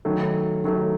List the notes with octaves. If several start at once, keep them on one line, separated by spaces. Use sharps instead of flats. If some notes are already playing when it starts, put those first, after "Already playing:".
D#3 F#3 A3
D#3 F#3 A3